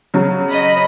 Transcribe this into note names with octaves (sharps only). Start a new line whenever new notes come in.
C#3 F#3
D#5 B5